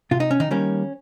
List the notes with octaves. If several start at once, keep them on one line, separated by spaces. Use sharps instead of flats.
C3 F4
D#4
C#4
D#3 D#4
D#3 G3 A#3 C#4